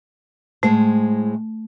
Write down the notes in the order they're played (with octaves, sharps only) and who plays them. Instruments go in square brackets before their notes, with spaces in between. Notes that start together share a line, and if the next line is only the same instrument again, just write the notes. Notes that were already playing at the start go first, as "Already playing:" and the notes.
[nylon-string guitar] A2 G#3 C5 [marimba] A3